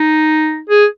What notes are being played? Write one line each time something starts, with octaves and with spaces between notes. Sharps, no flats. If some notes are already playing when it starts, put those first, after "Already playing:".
Already playing: D#4
G#4